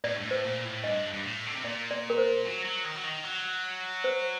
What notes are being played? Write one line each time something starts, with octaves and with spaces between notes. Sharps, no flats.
A2 D5
G2
A2
C5
A#2
A2
G2 D#5
G2
A2
D3
C3
A#2 D5
D5
A#4
C5
F#3
F#3
D#3
F#3
D#3
F#3
C5